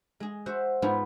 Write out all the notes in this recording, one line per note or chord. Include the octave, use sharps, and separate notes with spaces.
G#3 G#4
F#4 C5 E5 F#5
G#2 B3 F4 F#4 G#4 B5